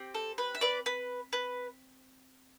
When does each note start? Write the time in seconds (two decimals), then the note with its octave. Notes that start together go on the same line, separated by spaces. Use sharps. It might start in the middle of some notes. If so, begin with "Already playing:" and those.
Already playing: C4 G4
0.14 A4
0.38 B4
0.55 E5
0.61 B4 D5
0.86 B4
1.33 B4